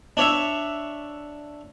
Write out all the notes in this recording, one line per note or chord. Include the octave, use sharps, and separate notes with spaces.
D4 C#5 E5